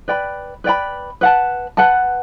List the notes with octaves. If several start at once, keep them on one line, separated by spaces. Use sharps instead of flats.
B4 D5 G5 B5
B4 D5 G5 B5
B4 F#5 A5
B4 F#5 A5